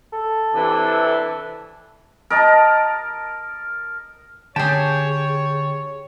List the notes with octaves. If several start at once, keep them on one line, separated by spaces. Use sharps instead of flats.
A4
C3 E3 D4
A#4 D#5 A5
D3 G4 G#4 C#5 G5 A5